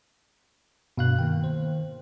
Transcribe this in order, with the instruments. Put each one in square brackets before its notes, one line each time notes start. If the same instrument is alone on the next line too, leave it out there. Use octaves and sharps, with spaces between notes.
[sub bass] G2 [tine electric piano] B2 F5 F#6
[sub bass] D#3 [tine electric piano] A#3 G5
[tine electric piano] C5